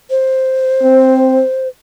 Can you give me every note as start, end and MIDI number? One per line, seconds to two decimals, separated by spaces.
0.10 1.68 72
0.83 1.42 60